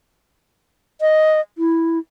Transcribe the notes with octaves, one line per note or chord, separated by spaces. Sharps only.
D#5
E4